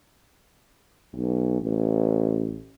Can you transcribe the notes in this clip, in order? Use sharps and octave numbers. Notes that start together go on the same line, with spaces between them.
B1
A1